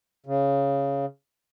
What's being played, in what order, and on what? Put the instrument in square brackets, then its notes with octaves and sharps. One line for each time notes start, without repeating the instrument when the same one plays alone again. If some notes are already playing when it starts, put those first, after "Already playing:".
[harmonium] C#3